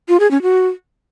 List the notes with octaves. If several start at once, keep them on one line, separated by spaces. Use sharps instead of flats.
F4
G#4
C#4
F#4